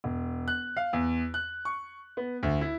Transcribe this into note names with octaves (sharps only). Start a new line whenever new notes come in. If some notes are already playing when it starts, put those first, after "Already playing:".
E1
F#6
F5
E2
F#6
C#6
B3
D2
E4